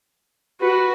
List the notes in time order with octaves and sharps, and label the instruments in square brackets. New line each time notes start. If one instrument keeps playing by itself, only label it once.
[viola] F#4 [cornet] B4